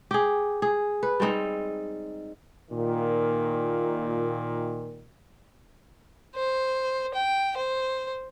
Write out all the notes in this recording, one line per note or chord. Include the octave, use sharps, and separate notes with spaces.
G4 G#4
G#4
B4
G3 G#3 C4 D#4
A#2 D#3
C5
G5
C5